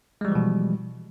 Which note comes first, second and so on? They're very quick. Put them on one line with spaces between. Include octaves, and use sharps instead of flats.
G#3 G3 F3 E3 B2